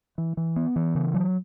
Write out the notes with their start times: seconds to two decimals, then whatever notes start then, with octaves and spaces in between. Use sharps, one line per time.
0.18 E3
0.37 E3
0.56 B3
0.76 E3
0.95 C#3
1.14 F#3